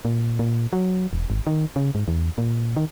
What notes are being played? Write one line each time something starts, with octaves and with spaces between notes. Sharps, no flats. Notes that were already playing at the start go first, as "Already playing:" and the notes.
A#2
A#2
F#3
E1
G#1
D#3
C#3
G#2
E2
A#2
D#3